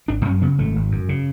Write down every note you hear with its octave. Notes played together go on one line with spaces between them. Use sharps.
G#1 D4
F#2 C#4
C#3 B3
G#1 A3
G#1
F#2
C#3